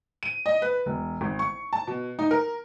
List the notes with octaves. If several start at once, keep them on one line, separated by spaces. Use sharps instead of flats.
D#7
D#5
B4
E1
G#1
C#6
A5
B2
D#4
A#4